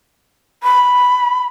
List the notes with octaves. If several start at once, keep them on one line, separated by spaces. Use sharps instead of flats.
B5